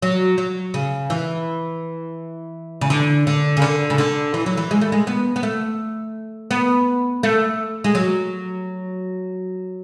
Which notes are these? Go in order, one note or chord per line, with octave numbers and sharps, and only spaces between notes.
F#3
F#3
C#3
E3
C#3
D3
D3
C#3
D3
C#3
D3
E3
F#3
E3
G#3
A3
G#3
B3
B3
A3
B3
A3
G#3
F#3